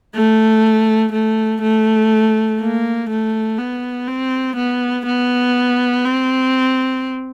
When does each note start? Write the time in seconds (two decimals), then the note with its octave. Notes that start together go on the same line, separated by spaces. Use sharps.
0.15 A3
1.12 A3
1.62 A3
2.60 A#3
3.10 A3
3.58 B3
4.08 C4
4.56 B3
5.06 B3
6.05 C4